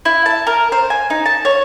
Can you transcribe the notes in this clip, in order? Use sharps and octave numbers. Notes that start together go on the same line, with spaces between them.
E4
A5
A#4
C5
G#5
D#4
A5
C#5